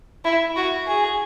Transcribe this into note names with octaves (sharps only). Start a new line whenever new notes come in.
E4
F#4
G#4